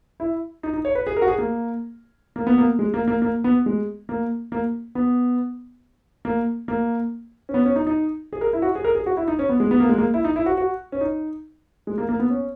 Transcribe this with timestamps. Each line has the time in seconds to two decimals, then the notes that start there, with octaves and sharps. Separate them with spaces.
0.20 E4
0.63 D#4
0.73 D#4
0.85 C#5
0.95 B4
1.07 G#4
1.16 A#4
1.22 F#4
1.28 G#4
1.38 A#3
2.36 A#3
2.47 B3
2.58 A#3
2.79 G#3
2.94 A#3
3.08 A#3
3.22 A#3
3.44 B3
3.66 G#3
4.09 A#3
4.52 A#3
4.95 B3
6.25 A#3
6.68 A#3
7.49 C#4
7.54 B3
7.66 C#4
7.76 D#4
7.87 D#4
8.33 G#4
8.41 A#4
8.53 E4
8.62 F#4
8.75 G#4
8.84 A#4
8.95 G#4
9.06 F#4
9.17 E4
9.28 D#4
9.39 C#4
9.49 B3
9.60 G#3
9.71 B3
9.80 A#3
9.89 G#3
9.98 A#3
10.14 E4
10.24 D#4
10.36 E4
10.46 F#4
10.57 F#4
10.92 C#4
11.01 D#4
11.87 G#3
11.98 A#3
12.09 A#3
12.19 B3
12.30 C#4